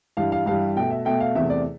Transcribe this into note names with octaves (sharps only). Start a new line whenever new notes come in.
G2 E3 G3 F5
F5
G2 E3 G3 F5
B2 A3 G5
E5
B2 A3 G5
F5
E2 C3 E3 A3 E5
D5